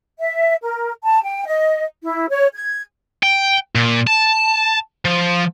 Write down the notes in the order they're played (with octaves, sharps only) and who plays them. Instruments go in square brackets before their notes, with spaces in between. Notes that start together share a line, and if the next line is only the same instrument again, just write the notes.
[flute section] E5
A#4
A5
G5
D#5
E4
C#5
G#6
[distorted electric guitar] G5
A#2
A5
F3